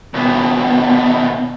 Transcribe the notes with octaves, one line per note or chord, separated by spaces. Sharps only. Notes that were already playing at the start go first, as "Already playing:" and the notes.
D#2 B2